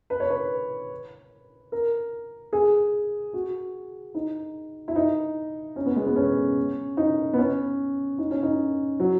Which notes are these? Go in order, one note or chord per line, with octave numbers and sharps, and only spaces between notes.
B4
C#5
B4
A#4
G#4
F#4
D#4
E4
D#4
C#4
B3
G#3
B3
C#4
D#4
B3
C#4
D#4
C#4
D#4
F#3